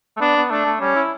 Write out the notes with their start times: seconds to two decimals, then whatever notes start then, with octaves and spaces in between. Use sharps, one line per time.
0.17 A3
0.21 B3 D4
0.36 B3
0.51 A3 D4
0.66 A3
0.81 G3 C#4
0.96 E4